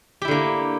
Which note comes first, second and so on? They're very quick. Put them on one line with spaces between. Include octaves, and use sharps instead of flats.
G4 E4 D3 A#3